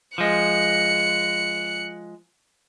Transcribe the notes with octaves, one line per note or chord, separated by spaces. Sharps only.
F3 G#3 F#6 C#7